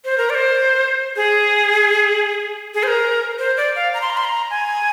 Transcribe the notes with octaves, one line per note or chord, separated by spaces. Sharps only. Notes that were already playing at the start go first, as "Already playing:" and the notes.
C5
A#4
D5
C5
G#4
G#4
C5
A#4
C5
D5
F5
A#5
C6
A#5
C6
A#5
G#5